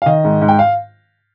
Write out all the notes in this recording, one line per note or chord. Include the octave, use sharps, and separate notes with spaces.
F5
D#3 D#5
G#2
G#2
G5
F5